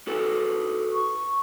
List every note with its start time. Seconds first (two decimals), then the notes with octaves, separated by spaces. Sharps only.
0.07 F#4 A4 B4
0.92 C#6